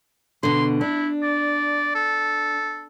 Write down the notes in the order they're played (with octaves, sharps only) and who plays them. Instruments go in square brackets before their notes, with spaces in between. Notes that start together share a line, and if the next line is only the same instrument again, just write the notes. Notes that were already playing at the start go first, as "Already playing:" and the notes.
[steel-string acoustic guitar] B2 D3 [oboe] C6
[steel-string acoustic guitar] D4 [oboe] E4
[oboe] D5
A4